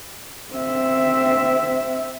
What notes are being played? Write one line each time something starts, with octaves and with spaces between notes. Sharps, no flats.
C4 E5